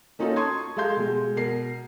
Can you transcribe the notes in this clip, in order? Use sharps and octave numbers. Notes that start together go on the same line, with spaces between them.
A#3 C#4 D#4 F4 F#4 A4
A5 C6 C#6 D#6 G#6
G#3 G4 A4 F5 C6 G6
B2 G#3
B2 A#4 C7